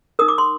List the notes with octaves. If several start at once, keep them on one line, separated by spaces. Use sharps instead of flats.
D#4 A#4 D#6
D6
C6